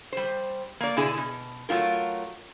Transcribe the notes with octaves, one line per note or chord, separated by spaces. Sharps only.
G3 C5
A#3 D5
B2 D3 E4 G#4
B2
F#3 A3 F4 A#4